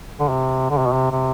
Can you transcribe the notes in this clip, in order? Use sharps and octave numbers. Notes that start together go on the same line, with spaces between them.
D3
C3
D3
C3
B2
C3
C3